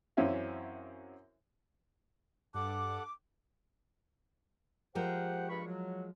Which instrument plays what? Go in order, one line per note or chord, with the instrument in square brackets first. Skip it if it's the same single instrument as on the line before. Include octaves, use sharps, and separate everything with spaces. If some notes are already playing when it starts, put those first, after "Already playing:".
[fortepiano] F#2 E3 C4 C#4 E5 F5
[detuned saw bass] G2 [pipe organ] A4 F#5 [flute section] D6
[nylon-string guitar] F3 G#3 A#4 [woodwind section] G4 C5 F#5
[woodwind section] G2 B5 C#6
F#3